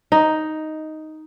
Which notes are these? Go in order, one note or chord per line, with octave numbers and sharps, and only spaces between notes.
D#4